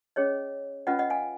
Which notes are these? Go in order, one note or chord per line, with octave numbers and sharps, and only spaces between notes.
C#4 G#4 C#5 D#5
C#4 F4 B4 D#5 F#5
D#5 F#5
F5 G#5